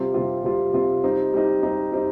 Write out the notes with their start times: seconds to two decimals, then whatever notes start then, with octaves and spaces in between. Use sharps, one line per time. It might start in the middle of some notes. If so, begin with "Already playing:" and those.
Already playing: C3 G3 C4 F4
0.14 C3 G3 C4 F4
0.44 C3 G3 C4 F4
0.73 C3 G3 C4 F4
1.04 G3 C4 D#4
1.33 G3 C4 D#4
1.63 G3 C4 D#4
1.92 G3 C4 D#4